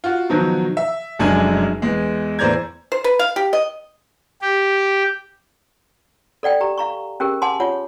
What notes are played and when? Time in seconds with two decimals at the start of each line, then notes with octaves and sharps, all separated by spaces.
0.04 F4 F#4
0.29 B2 D#3 F3 F#3
0.77 E5
1.19 F1 F#2 G#3 D4 G#5
1.82 E2 G#3
2.39 E2 A2 C5 D5 A#5 G#6
2.92 C5
3.04 B4
3.19 F5
3.36 G4
3.53 D#5
4.42 G4
6.43 A4 D5 F#5 G5
6.61 G4 A#5
6.78 F5 A#5 C#6
7.20 C#4 G4 G#4 A#4
7.42 F#5 G#5 A5 C6 D6
7.60 F4 C#5 F#5